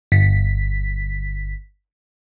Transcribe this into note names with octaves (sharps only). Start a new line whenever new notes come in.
G1 B6